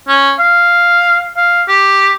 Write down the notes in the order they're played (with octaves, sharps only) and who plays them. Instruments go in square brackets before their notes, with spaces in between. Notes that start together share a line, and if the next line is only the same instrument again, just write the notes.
[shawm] C#4
F5
F5
G4